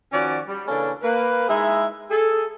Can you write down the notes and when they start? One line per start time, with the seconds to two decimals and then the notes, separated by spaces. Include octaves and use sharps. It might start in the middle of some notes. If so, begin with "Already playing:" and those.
0.12 D#3 F3 C#4 F#4 D5
0.48 G3
0.68 C#3 E3 A#3 C#4 D4 A4
1.02 A#3 B4
1.48 G#3 D#4 E4 G#4 E5
2.10 G#4 A4